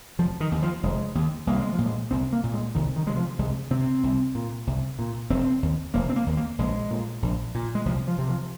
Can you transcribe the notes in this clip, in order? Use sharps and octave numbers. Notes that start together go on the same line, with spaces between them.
F1 F3
D#3
D#2
F3
F1 G#3
D#2
C2 A#3
G#3
F3
A#2
G#3
C2 C4
A#3
A#2
G#3
C2 D#3
D#3
C3 G#3
F3
C2 G#3
C3 C4
C2
A#2
C2
A#2
F1 C4
D#2
F1 A#3
C4
A#3
D#2
A#3
A#1 G#3
A#2
A#1
A#2
G#3
C2 F3
F3
C3
F3